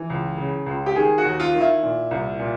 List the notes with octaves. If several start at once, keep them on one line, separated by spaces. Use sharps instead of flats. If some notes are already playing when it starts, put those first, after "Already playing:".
Already playing: E3
C#2
C#3
C#2
G4
D#3 G#4
F#4
D#2
F4
D#3
E4
A#2
C2
A#2